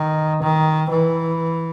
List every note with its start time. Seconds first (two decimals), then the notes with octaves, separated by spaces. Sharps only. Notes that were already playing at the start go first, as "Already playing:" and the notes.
Already playing: D#3
0.42 D#3
0.90 E3